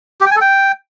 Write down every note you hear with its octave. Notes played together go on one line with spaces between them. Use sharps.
G4
G5
G#5
A4
G5